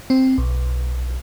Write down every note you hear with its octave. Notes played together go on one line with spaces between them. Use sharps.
C4
B1